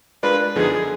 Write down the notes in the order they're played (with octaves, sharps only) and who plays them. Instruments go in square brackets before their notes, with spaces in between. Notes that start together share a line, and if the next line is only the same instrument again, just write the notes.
[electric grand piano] G#3 D4 F4 A#4 D5 [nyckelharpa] B4
[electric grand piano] F#2 D3 F3 B3 D#4 [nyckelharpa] G#4